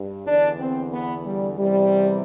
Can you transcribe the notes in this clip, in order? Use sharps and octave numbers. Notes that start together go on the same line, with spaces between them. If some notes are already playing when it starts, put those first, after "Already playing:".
Already playing: G2
E2 D3 D4
C4
B3
G3
E2 C3 E3 G3